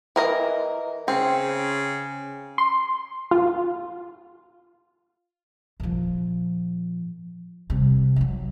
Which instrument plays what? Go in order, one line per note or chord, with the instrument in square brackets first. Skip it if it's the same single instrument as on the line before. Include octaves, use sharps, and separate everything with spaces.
[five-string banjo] E3 A#4 D#5
[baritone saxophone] C#3 [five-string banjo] C4
[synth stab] C6
F4
[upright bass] A#2 F3
C3 G3
F3 F#3